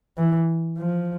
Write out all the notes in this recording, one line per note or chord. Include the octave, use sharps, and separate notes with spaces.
E3
F3